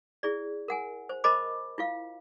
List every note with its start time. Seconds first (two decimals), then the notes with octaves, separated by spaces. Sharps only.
0.23 E4 G#4 D5
0.68 A#4 F#5 G#5
1.09 C5
1.24 A#4 C5 D#5 A5 B5 D6
1.78 E4 F4 F5